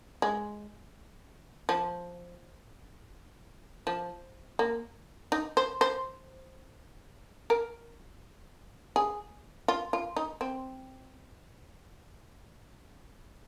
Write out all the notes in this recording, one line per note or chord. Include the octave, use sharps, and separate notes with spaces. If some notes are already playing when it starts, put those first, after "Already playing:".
G#3
F3
F3
A#3
D#4
C5
C5
A#4
G#4
F4
F4
D#4
C4